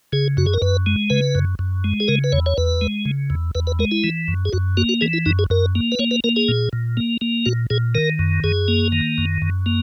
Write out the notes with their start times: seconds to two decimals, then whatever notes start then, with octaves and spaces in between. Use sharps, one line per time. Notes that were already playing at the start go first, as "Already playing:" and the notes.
0.12 C#3 G#4
0.37 F#2 F#4
0.47 G#4
0.54 A#4
0.62 F#2 B4
0.86 G#3
1.10 C#3 B4
1.35 F#2
1.59 F#2
1.84 G#3
2.00 G#4
2.08 C#3 A#4
2.24 B4
2.32 E2 C#5
2.46 C#5
2.58 E2 B4
2.81 G#3
3.05 C#3
3.30 E2
3.55 E2 B4
3.67 B4
3.79 G#3 A#4
3.91 E4
4.04 E3
4.28 F#2
4.45 G#4
4.53 F#2 F#4
4.77 A#3 F#4
4.89 F#4
5.01 E3 G#4
5.13 E4
5.26 F#2 D#4
5.39 G#4
5.50 F#2 A#4
5.75 A#3
5.92 B4
5.99 A#3 C#5
6.11 B4
6.24 A#3 A#4
6.36 G#4
6.48 A#2
6.73 A#2
6.97 A#3
7.21 A#3
7.46 A#2 F#4
7.70 A#2 G#4
7.95 D#3 A#4
8.19 F#2
8.44 F#2 G#4
8.68 A#3
8.92 D#3
9.18 F#2
9.42 F#2
9.66 A#3